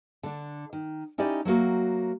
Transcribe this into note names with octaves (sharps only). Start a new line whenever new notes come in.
D3 D4
D#3
C#4 D#4 E4 G4 D5
F#3 A3 A#3 F#4